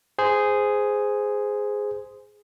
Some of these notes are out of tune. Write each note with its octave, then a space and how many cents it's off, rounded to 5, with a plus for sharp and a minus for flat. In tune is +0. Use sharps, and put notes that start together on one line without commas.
G#4 +0 C5 -15